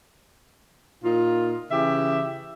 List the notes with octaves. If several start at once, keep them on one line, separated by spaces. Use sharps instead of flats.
A#2 D#4 F4
C#3 E3 G4 E5